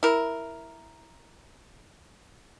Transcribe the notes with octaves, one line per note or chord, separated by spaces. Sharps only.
E4 A#4